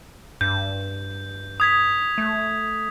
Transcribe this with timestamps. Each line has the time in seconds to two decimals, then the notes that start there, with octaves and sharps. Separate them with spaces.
0.41 G2 G6
1.60 D#6 G#6 B6
2.18 A3